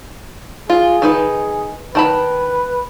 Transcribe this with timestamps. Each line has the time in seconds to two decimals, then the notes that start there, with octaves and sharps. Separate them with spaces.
0.70 F4 G#4
1.02 D#3 D#4 B4
1.95 D#3 B4 A5 B5